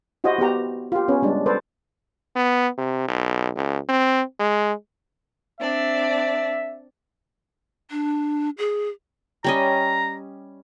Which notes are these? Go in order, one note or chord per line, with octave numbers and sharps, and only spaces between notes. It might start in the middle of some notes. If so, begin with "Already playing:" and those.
E4 F#4 G4 C5 D#5
B3 F#4 G4 A#5
F4 G4
B3 C#4 B4
G3 G#3 D4
A4 B4 C5 D5
B3
C3
B1
C#2
C4
G#3
C4 D4 D5 E5
D4
G#4
G3 C#4 D#5 A#5